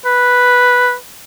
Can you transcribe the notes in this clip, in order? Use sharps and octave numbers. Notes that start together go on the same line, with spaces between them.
B4